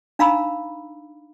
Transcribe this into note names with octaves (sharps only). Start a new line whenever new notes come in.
D4 D#4 F5 A#5 B5 E6